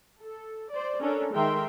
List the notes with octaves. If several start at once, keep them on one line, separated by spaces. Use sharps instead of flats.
A4
C5 D5
C#4 D4 A4 A#4
D#3 G#3 A#4 E5 G5 C6